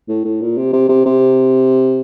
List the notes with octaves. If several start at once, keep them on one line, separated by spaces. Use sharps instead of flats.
A2
A2
A#2
C3
C3
C3
C3